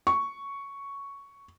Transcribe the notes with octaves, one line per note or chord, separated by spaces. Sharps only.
C#6